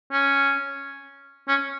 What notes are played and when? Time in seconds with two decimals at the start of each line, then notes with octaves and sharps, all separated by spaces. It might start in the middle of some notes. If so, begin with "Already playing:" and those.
0.12 C#4
1.48 C#4